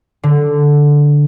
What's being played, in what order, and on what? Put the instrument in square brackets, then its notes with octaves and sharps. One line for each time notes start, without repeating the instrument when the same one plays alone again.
[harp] D3